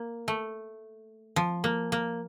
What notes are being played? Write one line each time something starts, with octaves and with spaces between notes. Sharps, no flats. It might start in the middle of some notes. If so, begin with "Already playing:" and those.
Already playing: A#3
A3
F3
A#3
A#3